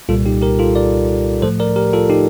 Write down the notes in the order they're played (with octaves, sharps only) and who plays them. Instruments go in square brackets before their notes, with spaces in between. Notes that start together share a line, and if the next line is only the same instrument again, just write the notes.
[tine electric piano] C2 A#2 G3 F4 A4
D#4 G4
G4 A#4
F4 A4
A#4 D5
A2 F3 A3 A4 C5
A#4 D5
G4 A#4
F4 A4
D#4 G4